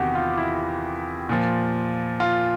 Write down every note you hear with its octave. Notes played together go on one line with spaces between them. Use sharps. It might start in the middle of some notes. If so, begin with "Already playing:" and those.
Already playing: E2 C3 D#3 F#4 G4
F4
E4
A#2 F3
F4